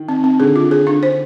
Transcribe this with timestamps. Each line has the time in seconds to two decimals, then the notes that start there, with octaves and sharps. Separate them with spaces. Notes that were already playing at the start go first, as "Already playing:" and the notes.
Already playing: D#3
0.09 C4
0.24 C4
0.40 D3 G#4
0.56 F4
0.71 G#4
0.87 D4
1.03 C5